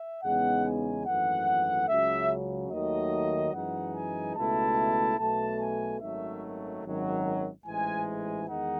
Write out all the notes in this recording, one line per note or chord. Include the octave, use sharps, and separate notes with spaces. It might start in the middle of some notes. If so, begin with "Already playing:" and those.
Already playing: E5
E2 C#3 G#3 B3 D#4 F#5
G#5
G#1 F#2 E3 A3 F#5
C#2 C#3 F#3 E5
D#2 D#3 F#3 A3 D#5
F#2 E3 G#3 D#4 F#5
G#5
C#2 B2 A3 E4 A5
B1 B2 A3 A5
G#5
G#1 F#2 D#3 F#3 A3 E5
G#1 F#2 D#3 F#3
A1 G#2 E3 G#3 G#5
G#5
E2 D#3 G#3 D#4 F#5